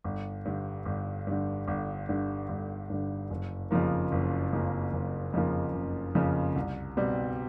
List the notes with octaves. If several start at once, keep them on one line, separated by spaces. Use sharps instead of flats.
G1
G2 D3
G1
G2 D3
G1
G2 D3
G1
G2 D3
F#1
F2 C#3 F3 A#3
F#1
F2 C#3 F3 A#3
F#1
F2 C#3 F3 A#3
F#1
F2 C#3 F3 A#3
C2
B2 G3 C4